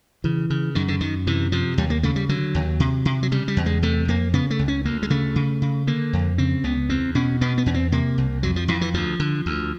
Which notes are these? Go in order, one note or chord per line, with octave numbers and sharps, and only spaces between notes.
C#3 E3
C#3
F#2 D#3
D3
F#2 D#3
C3 E3
C3 F3
D#2 G3
A#3
C#3 A3
G3
D3 F#3
D#2
C3
C3
F#3
C#3 G3
G3
E2
G#3
C3 A3
F2 A#3
C#3 B3
A3
C#2
C#4
D2 A#3
G#3
C#3 A3
C#3
C#3
D3 A#3
F2
C#3 C4
C#2 B3
E2 C4
B2 C#4
B2 B3
B3
E2 C#4
C4
C3 A#3
C2
F2 F#3
F3
F2 E3
E3
D2 F3
D3
D2